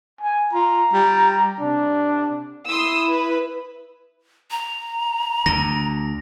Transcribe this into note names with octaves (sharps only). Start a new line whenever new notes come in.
G#5
F4 A#5
G3
C3 D4
E4 C6 D#6 E6
B4
A#5
D2 D3 A#6